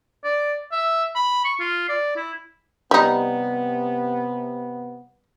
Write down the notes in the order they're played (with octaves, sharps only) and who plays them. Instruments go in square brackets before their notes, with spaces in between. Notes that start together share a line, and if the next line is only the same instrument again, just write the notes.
[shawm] D5
E5
B5
C#6
F4
D5
E4
[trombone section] C3 B3 [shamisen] G3 D#4